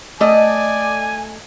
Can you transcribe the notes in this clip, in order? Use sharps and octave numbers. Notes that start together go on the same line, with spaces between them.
A3 D5 D#5 G#5